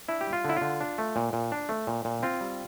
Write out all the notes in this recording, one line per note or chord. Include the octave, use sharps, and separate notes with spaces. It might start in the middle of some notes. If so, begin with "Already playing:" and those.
D4 E4
G4
G3
F4
D3 E4
D3 F4
D4
A3
A#2
A#2
D4
A3
A#2
A#2
C4 F4
G3